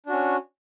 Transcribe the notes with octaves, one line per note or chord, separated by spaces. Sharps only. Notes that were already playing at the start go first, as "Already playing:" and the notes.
C#4 D4 F#4